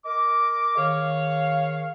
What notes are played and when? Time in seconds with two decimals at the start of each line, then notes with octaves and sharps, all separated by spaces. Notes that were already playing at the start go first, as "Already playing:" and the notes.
0.05 A#4 D#5 D6
0.77 D#3 G#4 C#5 F5